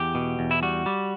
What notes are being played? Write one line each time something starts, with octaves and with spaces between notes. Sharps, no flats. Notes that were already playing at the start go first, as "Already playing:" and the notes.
Already playing: E2 G4
B2
E2
E4
G3 F#4
G3